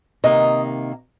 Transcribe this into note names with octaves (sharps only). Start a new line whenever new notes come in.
C3 D#3 A#3 D#5